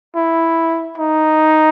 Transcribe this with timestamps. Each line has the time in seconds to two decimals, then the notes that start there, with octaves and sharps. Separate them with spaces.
0.15 E4
0.98 D#4